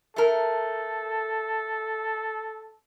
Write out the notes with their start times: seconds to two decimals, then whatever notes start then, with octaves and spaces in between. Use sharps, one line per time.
0.16 A3 A4 A#4